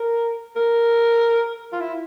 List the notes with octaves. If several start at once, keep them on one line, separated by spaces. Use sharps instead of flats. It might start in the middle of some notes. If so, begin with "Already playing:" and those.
Already playing: A#4
A#4
F4
E4